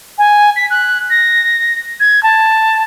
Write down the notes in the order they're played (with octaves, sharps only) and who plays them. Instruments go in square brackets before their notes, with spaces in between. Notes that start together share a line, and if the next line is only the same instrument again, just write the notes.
[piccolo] G#5
B6
F#6
A#6
G#6
A5